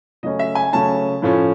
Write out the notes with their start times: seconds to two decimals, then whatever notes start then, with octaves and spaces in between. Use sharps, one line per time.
0.23 C#3 F#3 A3 C#4 D#5
0.39 E5
0.55 G#5
0.73 C#3 F#3 A3 C#4 A5
1.22 A2 F3 A3 C#4